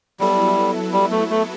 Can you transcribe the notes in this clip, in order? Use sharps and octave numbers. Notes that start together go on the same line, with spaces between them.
F#3 G3 B3 E4 A4
G3
A3
A3